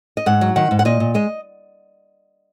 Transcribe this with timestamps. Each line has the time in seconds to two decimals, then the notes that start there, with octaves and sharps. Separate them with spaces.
0.17 D#5
0.26 G#2 F#5
0.41 F#3
0.56 D#3 F#5
0.71 G#2
0.79 F#5
0.85 A#2 D#5
1.00 A#2
1.14 G#3 D#5